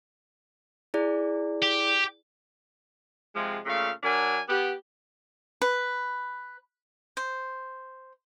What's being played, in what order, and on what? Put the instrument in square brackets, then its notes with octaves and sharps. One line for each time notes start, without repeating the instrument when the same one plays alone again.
[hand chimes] E4 G#4 D5
[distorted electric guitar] G4
[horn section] C3 F3 G#3
A#2 C#3 A3 F5
F#3 D4 A#4 G#5
B3 G4
[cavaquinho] B4
C5